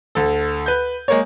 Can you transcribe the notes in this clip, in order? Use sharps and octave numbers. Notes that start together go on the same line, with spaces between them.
D2 A4
B4 G6
G#3 A#3 C#5